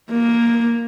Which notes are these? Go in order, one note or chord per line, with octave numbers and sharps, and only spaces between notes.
A#3